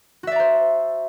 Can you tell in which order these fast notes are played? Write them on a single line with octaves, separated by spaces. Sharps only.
F#4 E5 D5 A#5 C5